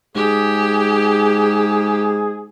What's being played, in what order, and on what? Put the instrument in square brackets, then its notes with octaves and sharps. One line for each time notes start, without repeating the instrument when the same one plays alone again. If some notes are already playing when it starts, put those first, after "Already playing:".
[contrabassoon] G#2 [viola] G4 [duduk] G#4